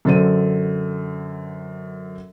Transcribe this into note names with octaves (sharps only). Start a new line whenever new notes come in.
F#2 D3 A4 C5 D#7